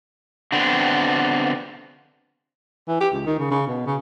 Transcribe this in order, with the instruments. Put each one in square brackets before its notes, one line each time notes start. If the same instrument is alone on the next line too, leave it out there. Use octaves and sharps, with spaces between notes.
[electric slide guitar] D3 B3 C4 D4
[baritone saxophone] E3
G4
C#2
D#3
C#3
C#3
B2
C#3